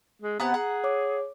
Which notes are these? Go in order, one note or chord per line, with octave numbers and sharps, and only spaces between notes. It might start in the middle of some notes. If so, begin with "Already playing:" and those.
G#3
C3 B3 F#5 G#5 A#5
G#4 F#5
C#5 D6